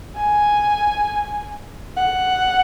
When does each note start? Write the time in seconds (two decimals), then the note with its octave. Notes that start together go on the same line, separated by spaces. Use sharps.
0.16 G#5
1.97 F#5